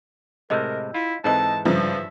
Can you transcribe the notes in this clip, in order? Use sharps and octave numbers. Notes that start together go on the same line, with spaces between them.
A2 C3 G#3 A#4 D#5 E6 G6
E4 F4
G#2 E3 C4 A4 D#5 A5
G2 C#3 F3 B4 C5 E5